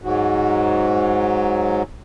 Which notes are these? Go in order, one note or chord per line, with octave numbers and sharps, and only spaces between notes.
G#2 F#3